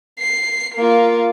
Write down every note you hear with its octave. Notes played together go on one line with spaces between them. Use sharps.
C7
A#3 F4